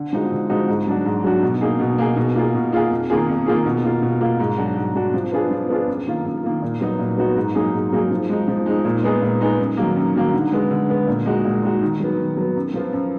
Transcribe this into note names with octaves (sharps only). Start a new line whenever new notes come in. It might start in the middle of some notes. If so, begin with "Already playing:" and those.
Already playing: D3
F3 G#3 D#4 F#4
D3
F3 G#3 D#4 F#4
G#2
F#3 D4 F#4
G#2
F#3 D4 F#4
B2
A#3 D#4 G#4
B2
A#3 D#4 G#4
B2
A#3 F4 G#4
B2
A#3 F4 G#4
F2
D#3 A#3 F4 G#4
F2
D#3 A#3 F4 G#4
B2
A#3 F4
B2
A#3 F4
G#2
F#3 D4 F#4
G#2
F#3 D4 F#4
F3
B3 D4 F4 G#4
F3
B3 D4 F4 G#4
F#2
D#3 A#3 F4
F#2
D#3 A#3 F4
A#2
F#3 B3 D#4 F#4
A#2
F#3 B3 D#4 F#4
G#2
F#3 A#3 D#4 G#4
G#2
F#3 A#3 D#4 G#4
F3
G#3 D#4
F3
G#3 D#4
A#2
G#3 B3 D#4 G#4
A#2
G#3 B3 D#4 G#4
F#2
D#3 F#3 A#3
F#2
D#3 F#3 A#3
D3
G#3 B3
D3
G#3 B3
A#2
G#3 D#4 F#4
A#2
G#3 D#4 F#4
D#3
F#3 B3
D#3
F#3 B3
F#2
F3 B3 F4
F#2